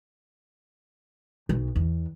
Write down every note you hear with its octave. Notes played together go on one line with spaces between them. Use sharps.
B1
E2